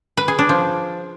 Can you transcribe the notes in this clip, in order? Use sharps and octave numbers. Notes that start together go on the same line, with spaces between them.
B4
G#4
D4
F3